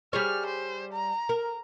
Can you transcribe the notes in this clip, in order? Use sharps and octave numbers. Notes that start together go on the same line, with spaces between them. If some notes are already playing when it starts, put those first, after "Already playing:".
G3 G#4 C#5 F6
C5
A#5
A#4